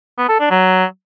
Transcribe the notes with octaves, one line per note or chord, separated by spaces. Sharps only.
B3
A4
D4
F#3